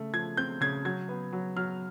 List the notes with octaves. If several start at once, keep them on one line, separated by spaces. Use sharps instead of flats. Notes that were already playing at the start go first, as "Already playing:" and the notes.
Already playing: C#3 A3
F3 G#6
C4 G6
C#3 G#6
F#3 G#6
B3
F#3
F#3 F6